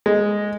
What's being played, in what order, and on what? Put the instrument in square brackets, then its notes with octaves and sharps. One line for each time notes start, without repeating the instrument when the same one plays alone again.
[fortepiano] G#3